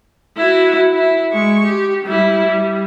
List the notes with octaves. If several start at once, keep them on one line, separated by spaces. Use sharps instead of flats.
E4 F#4
E4
G#3 C#6
G4
G3 E4
G3